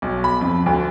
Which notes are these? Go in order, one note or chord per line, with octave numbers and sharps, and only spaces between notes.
B1
B5
F2
D2